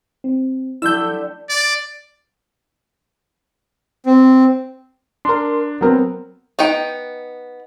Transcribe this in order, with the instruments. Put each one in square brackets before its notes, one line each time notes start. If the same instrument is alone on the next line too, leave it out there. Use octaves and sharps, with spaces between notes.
[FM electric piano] C4
[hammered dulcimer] D3 A3 G4 [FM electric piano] F3 F#3 E4 [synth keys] E6 G6
[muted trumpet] D5
[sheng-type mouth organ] C4
[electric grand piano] D4 [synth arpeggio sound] A#4 C6
[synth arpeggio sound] F#3 A#4 [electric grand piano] B3 C4
[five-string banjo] B3 D#4 G5